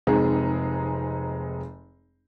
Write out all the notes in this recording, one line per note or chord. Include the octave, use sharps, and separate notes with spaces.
F1 G#3 C4 D#4 G#4